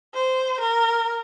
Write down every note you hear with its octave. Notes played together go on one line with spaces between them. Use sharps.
C5
A#4